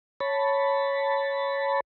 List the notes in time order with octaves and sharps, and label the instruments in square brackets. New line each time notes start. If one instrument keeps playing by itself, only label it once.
[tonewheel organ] C#5 A5 B5